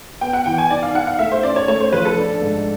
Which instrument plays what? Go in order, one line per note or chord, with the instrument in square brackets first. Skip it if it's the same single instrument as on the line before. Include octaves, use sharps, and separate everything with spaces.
[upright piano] B3 [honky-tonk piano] G5
[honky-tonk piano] F#5
[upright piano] E3 [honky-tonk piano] G5
[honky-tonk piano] G#5
[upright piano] D#4 [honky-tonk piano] D5
[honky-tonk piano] F5
[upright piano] D#4 [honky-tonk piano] F#5
[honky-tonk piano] F5
[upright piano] A3 [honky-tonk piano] E5
[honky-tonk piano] C5
[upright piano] C#4 [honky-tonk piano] D5
[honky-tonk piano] C#5
[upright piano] A3 [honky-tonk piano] C#5
[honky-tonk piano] C5
[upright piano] F3 [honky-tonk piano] B4
[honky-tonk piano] A4
[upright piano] D4
G#2